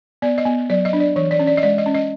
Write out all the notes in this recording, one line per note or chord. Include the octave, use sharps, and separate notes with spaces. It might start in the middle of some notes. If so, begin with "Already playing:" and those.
B3 D5
D#5
B3
F#3 D5
D#5
D4
D5
E3 C#5
D5
C#4
D5
D#5
G#3 D5
D#5
C#4
D#5